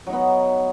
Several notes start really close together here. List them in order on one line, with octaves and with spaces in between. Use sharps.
F#3 D#4 B3